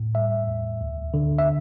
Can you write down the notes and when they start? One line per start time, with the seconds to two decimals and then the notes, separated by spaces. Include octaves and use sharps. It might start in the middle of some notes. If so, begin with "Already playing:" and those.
Already playing: A2
0.15 G3 E5
0.47 E2
0.81 D2
1.14 D3
1.38 E5